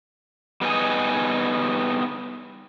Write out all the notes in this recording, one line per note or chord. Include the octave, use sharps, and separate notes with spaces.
G3 B3 D4 D#4 G#4 G#5